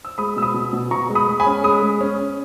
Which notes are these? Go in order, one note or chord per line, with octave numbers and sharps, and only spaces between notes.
E6
G#3 B5 D#6
B2 E6
B5 D#6
B2
B2
B2 A#5 C#6
G#3
B5 D#6
G#3
G#5 B5
C#4
G#3 B5 D#6
G#3
C#4
C#4